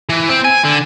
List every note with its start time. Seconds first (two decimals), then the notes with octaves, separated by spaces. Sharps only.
0.09 E3
0.29 C4
0.45 G#5
0.65 D3